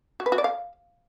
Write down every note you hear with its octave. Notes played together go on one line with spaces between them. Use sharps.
F#4
B4
F#4
D5
F5